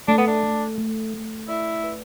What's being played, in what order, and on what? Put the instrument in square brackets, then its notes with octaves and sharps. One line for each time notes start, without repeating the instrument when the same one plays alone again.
[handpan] A3 [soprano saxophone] D4
[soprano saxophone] B3
D4
[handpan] A3
A3
A3
[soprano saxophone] E4 [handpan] D5
[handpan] B4